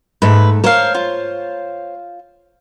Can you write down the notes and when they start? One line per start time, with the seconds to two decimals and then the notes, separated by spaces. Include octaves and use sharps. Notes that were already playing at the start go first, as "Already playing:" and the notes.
0.22 G#2 A3 B4
0.64 A#4 C5 C#5 F5
0.95 F4